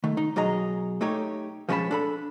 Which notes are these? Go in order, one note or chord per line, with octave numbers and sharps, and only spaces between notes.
D#3 A3
D#4
B1 F#3 G#4 D#5 A#5
A3 D#4 G4 C#5
F3 G#3 C#4 F4 A5 B5
D4 A4 B5